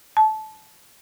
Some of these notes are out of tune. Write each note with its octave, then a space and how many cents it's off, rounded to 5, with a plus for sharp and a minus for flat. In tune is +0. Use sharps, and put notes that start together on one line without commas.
A5 -20